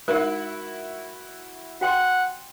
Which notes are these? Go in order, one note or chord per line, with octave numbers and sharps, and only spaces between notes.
G#3 D#4 E4 F#4 A#4
F#4 F#5 G5 C6